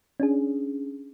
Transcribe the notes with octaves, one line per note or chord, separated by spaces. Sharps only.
C#4 D4 G#4